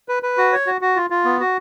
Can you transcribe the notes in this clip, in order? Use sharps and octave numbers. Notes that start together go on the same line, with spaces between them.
B4
B4
F#4
C#5
F#4
F#4
F4
F4
B3
F#4